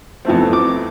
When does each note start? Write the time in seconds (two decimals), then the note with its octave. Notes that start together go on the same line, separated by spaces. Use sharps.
0.25 F2 E3 A3 C4
0.53 D6